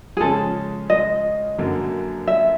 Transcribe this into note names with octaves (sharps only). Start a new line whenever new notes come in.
G#4
C#3 F3 G#3 C#4 A4
D#5
F#2 D3 F#3 A#3
E5